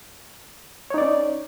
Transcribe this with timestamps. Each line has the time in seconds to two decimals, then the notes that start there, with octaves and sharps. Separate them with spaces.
0.90 C#5
0.94 D#4
0.98 D5
1.02 C#4